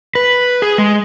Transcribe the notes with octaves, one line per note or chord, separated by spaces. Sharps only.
B4
G#4
G#3